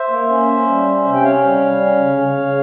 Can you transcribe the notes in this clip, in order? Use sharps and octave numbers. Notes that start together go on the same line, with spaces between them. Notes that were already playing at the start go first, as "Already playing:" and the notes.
Already playing: C5 E5
A#3
C#4
C#4
G3
C#4
C3
G5
C#4 C#5 F5
G3
G3
C#4
C#3
C#3
C#3